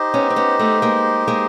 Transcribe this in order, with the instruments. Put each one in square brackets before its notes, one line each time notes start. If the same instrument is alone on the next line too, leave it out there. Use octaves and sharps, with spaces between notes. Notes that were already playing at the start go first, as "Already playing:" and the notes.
Already playing: [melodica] D#4 G4 C5 D#5
[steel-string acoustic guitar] B3 C#4
C4
B3 C#4
A3 B3
G#3 A#3
G#3 A#3